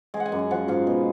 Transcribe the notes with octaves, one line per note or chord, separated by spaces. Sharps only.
G#3 G#5
F#5
G#5
F#2
G#5
F3 F#5
G#2 F5
B2